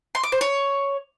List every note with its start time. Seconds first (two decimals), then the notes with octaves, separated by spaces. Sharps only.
0.15 C6
0.23 D6
0.32 C5
0.41 C#5